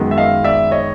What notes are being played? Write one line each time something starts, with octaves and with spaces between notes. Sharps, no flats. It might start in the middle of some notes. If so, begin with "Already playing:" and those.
Already playing: F#2 D#3 G#3 B3
E5
D#5 F5
D5 E5
C#5 D#5